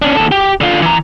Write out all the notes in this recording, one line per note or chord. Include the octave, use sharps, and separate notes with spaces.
C#4 D4
D#2 A4
G4
D3 F4
E3 A#5